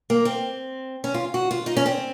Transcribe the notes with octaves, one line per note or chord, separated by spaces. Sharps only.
A#3
C4
C#4
F4
F#4
F4
D#4
C#4
C4